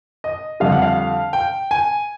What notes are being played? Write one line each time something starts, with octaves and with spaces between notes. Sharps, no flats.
D#5
F2 D3 G3 F5
F#5
F5
G5
G#5